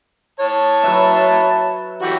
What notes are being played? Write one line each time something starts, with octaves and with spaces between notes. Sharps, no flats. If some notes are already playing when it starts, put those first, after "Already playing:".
C#5 A5
F#3 B4 E5
E3 F#4 G4